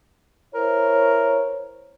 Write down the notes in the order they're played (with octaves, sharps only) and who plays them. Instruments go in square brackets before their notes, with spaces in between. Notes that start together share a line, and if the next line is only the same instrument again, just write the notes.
[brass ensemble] E4 C5 C#5 [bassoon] A#4